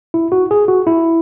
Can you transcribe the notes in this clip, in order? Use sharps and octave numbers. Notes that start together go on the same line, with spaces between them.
E4
F#4
G#4
F#4
E4